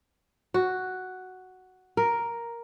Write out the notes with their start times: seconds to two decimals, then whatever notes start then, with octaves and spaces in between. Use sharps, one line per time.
0.54 F#4
1.97 A#4